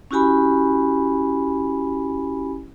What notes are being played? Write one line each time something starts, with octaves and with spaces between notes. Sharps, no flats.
C#4 E4 F#4 G4 G#5 B5